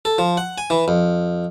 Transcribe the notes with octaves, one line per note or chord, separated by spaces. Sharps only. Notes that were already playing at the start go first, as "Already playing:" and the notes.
A4
F3
F#5
G#5
E3
F2